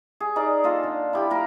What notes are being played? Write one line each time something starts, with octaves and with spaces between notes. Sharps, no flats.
G#4
D#4 G#4 A#4 D5
A#3 F4 A4 D#5
D3
E4 G4 B5
A#3 A#4